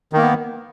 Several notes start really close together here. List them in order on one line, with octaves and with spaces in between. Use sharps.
D#3 A#3 B3